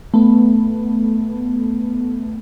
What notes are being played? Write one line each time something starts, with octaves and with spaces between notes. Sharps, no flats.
A3 B3